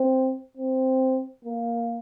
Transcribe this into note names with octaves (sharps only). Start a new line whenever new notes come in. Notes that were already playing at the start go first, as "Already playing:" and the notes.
Already playing: C4
C4
A#3